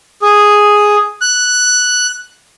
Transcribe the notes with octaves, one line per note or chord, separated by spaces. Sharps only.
G#4
F#6